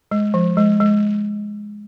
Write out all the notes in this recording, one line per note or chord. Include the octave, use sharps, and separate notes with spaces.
G#3
F3
G#3
G#3